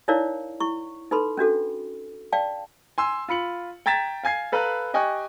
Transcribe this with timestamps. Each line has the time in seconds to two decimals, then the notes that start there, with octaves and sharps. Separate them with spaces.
0.08 D#4 E4 A#4 C#5 D5 F5
0.60 E4 C#6
1.11 D#4 A4 B4 B5 C6
1.37 C#4 D4 F#4 A4
2.32 D5 F5 G5 A5
2.98 G#5 C6 E6
3.28 F4 B5 C#7 F#7
3.86 G5 A#5 G#6 A6 B6 E7
4.23 F5 G#5 G#6 C7
4.52 A4 B4 F5 A#5 B5 F#6
4.94 G4 D#5 G5 G#5 C#6 F#6